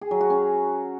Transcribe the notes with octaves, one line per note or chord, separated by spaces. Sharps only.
G#4
F#3
F#4
C#4